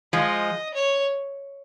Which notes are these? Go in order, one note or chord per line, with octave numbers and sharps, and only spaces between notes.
F3 G#3 D#5
C#5